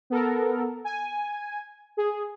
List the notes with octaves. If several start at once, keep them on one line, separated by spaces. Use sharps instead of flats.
B3 A4 A#4
G#5
G#4